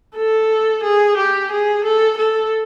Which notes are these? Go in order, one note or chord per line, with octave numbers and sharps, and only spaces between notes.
A4
G#4
G4
G#4
A4
A4